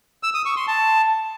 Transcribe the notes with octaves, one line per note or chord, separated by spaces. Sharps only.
E6
D#6
C#6
C6
A5